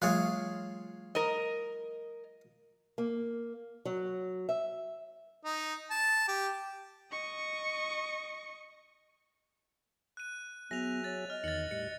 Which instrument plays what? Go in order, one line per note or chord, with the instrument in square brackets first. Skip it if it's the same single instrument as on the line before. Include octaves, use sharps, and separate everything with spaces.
[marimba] F3 G3 A3 [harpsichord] F4 G#4 C#5
[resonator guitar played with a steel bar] A#4 D#5
[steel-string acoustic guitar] A#3
F#3
E5
[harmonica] D#4
A5
G4
[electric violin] D#5 C#6
[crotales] F#6 D#7
[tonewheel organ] F#3 G#4 E5 [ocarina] B3 [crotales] A#6 F7
[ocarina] C#5 [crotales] A6
[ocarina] D#5 [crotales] F6
[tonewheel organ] E2 D#3 F#6 [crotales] A6 C#7
[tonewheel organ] A2 G3 [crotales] C#7